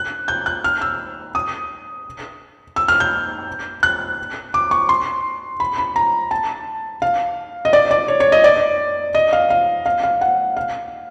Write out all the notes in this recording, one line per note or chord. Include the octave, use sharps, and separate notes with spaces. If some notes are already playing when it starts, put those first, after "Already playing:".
Already playing: F#6
G6
F#6
F6
E6
D#6
E6
F6
G6
F#6
D6
C#6
C6
B5
B5
A#5
A5
F5
D#5
D5
D5
C#5
C#5
D#5
D5
D#5
F5
F5
F5
F5
F#5
F5